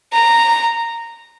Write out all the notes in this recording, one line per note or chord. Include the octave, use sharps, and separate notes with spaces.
A#5